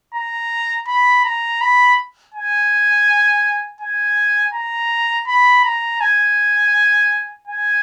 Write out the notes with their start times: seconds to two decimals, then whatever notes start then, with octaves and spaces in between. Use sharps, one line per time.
0.15 A#5
0.87 B5
1.25 A#5
1.61 B5
2.34 G#5
3.81 G#5
4.54 A#5
5.27 B5
5.65 A#5
6.01 G#5
7.48 G#5